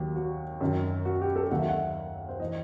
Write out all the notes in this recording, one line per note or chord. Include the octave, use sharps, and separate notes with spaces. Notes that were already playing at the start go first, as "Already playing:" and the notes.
Already playing: D#2 D#3 F#3 G4
F#4
F#2 D#3 F#3
F#4
G4
A4
D#2 D#3 F#3 F#5
E5
F#5
C5
E3 D#5